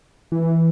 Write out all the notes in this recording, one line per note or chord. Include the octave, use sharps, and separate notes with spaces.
E3